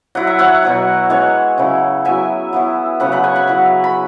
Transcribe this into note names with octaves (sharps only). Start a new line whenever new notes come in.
F#3 E4 F#5
E5
C#5 F#5
B2 F#3 E4
E3 G#3 C#4 C#5 F#5
C#3 F#3 C#4 E4
F#3 B3 E4 E5 G#5
E3 B3 E4
C#3 F#3 C#4 F#5 B5
F#5 B5
G#5 C#6
F#5 B5
F#3 E4
B5